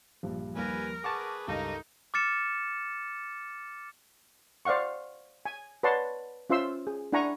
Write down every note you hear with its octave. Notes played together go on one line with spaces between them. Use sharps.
A#1 G2 F3
D#2 G3 A#4 B4 G#5
G#4 B4 F#5 A5 C#6 D6
C#2 G2 D#4 A4 A#4
D6 F6 A6 C#7 E7
C5 D5 F5 F#5 C#6
G#5
B4 C#5 D5 F#5 A5 C6
C#4 F4 C5 E5 C6 E6
G#4
D4 E4 F#5 G#5 A#5 C#6